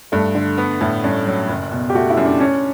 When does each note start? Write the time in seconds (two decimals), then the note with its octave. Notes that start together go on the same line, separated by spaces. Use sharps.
0.12 G2 A3
0.35 D3
0.58 B3
0.81 A2
1.04 G2 C#4
1.27 F#3
1.49 F#1
1.71 B2
1.90 G4
1.95 A3 F#4
2.10 E4
2.17 F#2
2.25 D4
2.40 C#4 D4